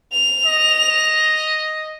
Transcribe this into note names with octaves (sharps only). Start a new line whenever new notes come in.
F7
D#5